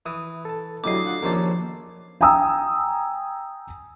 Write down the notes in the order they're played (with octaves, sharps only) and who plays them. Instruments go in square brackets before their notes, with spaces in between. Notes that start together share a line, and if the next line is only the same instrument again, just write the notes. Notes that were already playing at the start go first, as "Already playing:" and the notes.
[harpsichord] E3 [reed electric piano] E5 D#6
[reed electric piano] A4 A5
[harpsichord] D2 D#5 [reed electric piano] F#3 E4 G4 [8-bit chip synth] D6 C7
[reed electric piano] D4 F4 F#5
[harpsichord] A#1 D#2 C#4 [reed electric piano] A#4 C5 A5
[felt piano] G5 G#5 A#5 D#6 E6